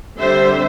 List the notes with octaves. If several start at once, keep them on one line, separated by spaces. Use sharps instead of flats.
D3 G3 C4 C5 E5